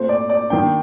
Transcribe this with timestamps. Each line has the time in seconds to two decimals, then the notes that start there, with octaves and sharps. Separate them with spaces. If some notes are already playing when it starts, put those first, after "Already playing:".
Already playing: A#2 A3 C4 C5
0.09 D5
0.30 D5
0.50 D#3 A#3 D4 G5